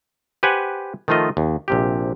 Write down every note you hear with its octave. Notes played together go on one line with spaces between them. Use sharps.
G4 B4 C5 F#5 G#5
D#3 F3 A3 F4 D#5
D#2
A#1 C3 G4